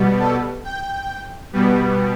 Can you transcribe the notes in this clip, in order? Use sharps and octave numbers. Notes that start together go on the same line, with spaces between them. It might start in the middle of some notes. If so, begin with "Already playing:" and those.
Already playing: B2 G3 B3
A4
G5
B2 G3 B3